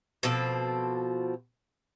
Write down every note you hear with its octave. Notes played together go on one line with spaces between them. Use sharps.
B2 F3 C4 A4